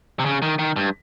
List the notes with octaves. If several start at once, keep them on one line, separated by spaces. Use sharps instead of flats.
C3
C#3
D#3
D#3
G2